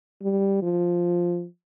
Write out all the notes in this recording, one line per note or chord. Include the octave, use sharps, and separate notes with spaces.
G3
F3